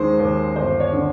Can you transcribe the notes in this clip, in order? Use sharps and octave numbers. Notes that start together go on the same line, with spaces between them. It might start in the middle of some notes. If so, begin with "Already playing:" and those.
Already playing: D#2 D#3 G#3 C5
D#2
G1 C5
C#5
D3